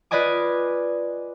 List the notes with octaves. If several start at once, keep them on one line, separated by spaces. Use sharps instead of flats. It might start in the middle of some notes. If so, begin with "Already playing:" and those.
F4 B4 D5 D#5 G#5 D6